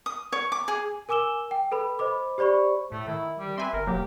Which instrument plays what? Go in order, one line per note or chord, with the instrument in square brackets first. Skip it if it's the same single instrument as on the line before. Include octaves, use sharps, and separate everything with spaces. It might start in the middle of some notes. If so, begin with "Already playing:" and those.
[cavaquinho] D#6
C#5
D6
G#4
[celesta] A#4 G#5 D6 E6 E7 G7
G5
A4 B4 B5
C5 D#5 B5 D6
G4 C5 D5 B5 C#6
[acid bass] A2 [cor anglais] A3
[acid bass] D#3 [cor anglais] E4
[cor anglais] G3
[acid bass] C4 [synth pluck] B4 G#5 C6 [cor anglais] E5
[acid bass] G1 [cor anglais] A#4
[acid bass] E1 [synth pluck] F#3 A#3 [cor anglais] G4